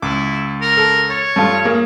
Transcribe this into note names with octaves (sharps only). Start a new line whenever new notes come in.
C#2 E4 D6
A#4
A4
C#5 A6
G2 A3 F4
A#3 G#4 A#4